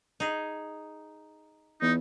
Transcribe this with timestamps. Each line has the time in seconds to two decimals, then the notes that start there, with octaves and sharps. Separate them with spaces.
0.20 D#4 G#4
1.82 E2 D#4